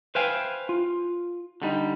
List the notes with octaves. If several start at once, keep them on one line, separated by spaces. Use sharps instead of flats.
B4 C5 E5 F5 G5 G#5
F4
D3 G3 D#4